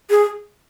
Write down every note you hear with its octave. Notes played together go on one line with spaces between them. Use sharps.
G#4